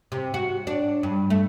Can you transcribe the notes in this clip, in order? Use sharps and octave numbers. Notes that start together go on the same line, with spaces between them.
C3
F#4
D4
G2
A3